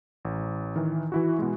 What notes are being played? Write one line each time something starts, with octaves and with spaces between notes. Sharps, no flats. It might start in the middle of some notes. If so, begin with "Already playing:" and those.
A1
D#3 E3
E3 E4 F#4
B2 G#3